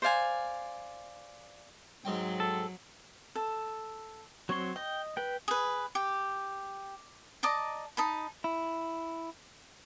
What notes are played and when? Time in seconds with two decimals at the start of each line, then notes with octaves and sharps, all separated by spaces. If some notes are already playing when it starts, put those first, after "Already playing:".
0.02 C5 D5 F5 G#5
2.05 G#2 F#3 C4 G5
2.40 A4
3.35 A4
4.49 F#3 C4 C#5 C6
4.76 D#5 G5
5.17 B4 G5
5.48 G#4 B4
5.95 G4
7.43 D5 D#5 A5 A#5
7.97 D#4 A5 B5
8.44 E4